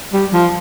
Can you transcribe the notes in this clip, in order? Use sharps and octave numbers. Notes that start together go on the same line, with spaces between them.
G3
F3